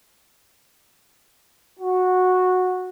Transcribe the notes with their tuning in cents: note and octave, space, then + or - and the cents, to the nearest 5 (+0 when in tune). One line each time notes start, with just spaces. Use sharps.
F#4 -10